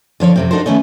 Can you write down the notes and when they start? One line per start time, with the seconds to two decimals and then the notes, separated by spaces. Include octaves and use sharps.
0.20 D3 F3 C#5 F5
0.36 F2 C3 C4
0.51 D4 D#4 F#4 A4 A#4 C5
0.66 D#3 A3 B3 C#4 D#4